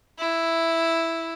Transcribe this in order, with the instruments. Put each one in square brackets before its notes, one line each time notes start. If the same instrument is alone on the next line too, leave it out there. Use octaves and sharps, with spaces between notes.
[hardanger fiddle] E4